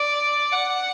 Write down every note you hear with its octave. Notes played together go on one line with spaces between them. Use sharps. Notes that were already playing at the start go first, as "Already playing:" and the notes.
Already playing: D5
F#5